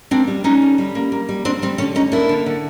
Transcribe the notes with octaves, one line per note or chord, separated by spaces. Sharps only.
A#3 C4 D4
G3
G3 C#4 D#4
D3
G3
A#3
A#3
G3
D3 C4 D4
G3 C4
D3 C#4
D3 C#4 D#4
A#3 D4 E4
D3
D3